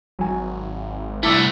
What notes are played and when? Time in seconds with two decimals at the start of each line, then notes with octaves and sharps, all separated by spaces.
0.19 G#1 F#3 G#5
1.23 C2 A3 E4 A5 D6 E6